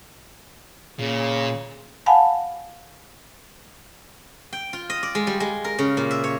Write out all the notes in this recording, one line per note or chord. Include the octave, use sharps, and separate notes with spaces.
A#2 C#3
F5 F#5 G#5 A5 B5
G5
F4
D#5
D5
G#3
G3
G#3
A#4
C#3
A#2
E5
C#5